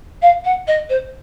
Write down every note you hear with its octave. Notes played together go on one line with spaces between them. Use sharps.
F5
F#5
D#5
C5